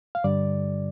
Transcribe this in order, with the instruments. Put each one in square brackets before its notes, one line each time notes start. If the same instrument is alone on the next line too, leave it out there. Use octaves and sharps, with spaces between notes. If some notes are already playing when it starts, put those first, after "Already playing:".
[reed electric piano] F5
G2 D3 G3 D5